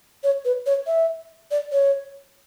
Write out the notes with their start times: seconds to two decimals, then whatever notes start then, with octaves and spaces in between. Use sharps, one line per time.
0.24 C#5
0.45 B4
0.66 C#5
0.87 E5
1.51 D5
1.72 C#5